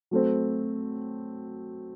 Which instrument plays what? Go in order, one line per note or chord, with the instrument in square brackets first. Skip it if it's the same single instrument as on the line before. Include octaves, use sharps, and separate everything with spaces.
[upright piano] F#3 A3 C4